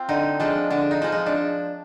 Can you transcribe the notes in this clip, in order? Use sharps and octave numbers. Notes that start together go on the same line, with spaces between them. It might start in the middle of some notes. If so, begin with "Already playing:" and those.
Already playing: C4 F4
D3 D#4
F3 G#3 D4
D3 D4
D#4
F3 G#3
D#4
D4